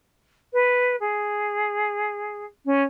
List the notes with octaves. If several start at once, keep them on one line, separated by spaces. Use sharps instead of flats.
B4
G#4
C#4